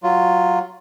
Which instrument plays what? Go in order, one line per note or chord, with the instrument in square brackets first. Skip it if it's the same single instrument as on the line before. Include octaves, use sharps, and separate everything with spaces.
[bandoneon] F#3 F4